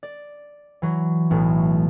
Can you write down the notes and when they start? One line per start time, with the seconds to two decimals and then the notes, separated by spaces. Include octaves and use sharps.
0.03 D5
0.82 E3 F#3
1.31 B1 A2 A3